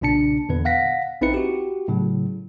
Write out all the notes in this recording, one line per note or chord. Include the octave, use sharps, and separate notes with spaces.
B1 A#2 C#3 D4 A5 C#7
E2 A#2 D3 B3 B4
F5 F#5 A#6 B6
A#1 C4 D#4 E4 B4 C#7
F#4 G4
A2 C#3 F#3